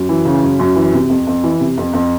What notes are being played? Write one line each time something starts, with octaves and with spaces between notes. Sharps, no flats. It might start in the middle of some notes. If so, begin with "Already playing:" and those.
Already playing: F#2
E3
C#3
F#2
F#2
E3
C3
F2
F2
E3
C3
F2
F2